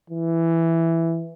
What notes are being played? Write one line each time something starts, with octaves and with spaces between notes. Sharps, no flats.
E3